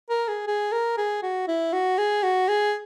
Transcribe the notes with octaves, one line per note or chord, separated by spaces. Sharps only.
A#4
G#4
G#4
A#4
G#4
F#4
E4
F#4
G#4
F#4
G#4